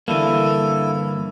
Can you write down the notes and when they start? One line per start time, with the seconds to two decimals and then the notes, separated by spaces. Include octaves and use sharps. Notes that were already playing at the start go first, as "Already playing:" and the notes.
0.08 G2 D3 E3 A#3 E4 A4